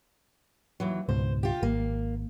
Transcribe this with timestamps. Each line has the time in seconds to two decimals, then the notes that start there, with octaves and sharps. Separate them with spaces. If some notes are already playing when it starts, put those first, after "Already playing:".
0.80 D#2 E3 F#3
1.09 C#2 G#2 B2 C5
1.43 F4 G4
1.63 G#1 A#3